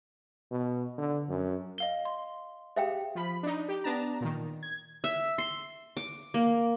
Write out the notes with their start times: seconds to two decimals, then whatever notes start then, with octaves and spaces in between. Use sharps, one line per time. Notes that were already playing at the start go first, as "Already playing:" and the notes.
0.51 B2
0.98 D3
1.28 F#2
1.78 D#5 F5 G7
2.05 C6
2.76 G4 G#4 E5 F5 G5
3.15 F3 B5
3.43 D4 D#4
3.68 G4
3.84 B3 D4 A5 A#5
4.21 A#2 D#3
4.63 G#6
5.04 E5
5.38 C6
5.97 D6
6.34 A#3